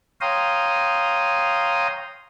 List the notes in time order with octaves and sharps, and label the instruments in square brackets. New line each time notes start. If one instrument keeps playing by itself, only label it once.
[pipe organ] C#5 F5 G5 A#5 C6 D#6